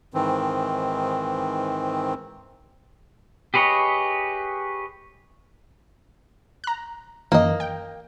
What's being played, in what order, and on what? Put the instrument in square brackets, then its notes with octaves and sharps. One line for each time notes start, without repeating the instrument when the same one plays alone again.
[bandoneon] G#2 D#3 E3 C4
[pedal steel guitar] G4 G#4 B4 C#5 D#5
[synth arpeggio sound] A#5 F#6
[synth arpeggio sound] F#2 D#3 E3 [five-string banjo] A#3 D#5
[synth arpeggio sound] G5